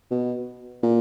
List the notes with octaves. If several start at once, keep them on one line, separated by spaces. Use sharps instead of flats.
B2
A#2